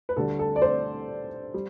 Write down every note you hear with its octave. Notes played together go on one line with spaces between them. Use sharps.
B4
D2 D3 G3 A4
A4
D5
C5
G3